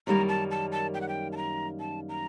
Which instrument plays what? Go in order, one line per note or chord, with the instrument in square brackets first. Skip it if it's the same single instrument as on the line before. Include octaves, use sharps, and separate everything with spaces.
[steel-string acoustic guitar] F#2 D#3 G3 A#3 [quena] A#5
[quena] A5
A5
A5
G5
F#5
G5
A5
A#5
A5
A#5